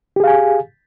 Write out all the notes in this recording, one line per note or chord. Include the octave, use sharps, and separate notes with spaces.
G4 G#4 F5 G#5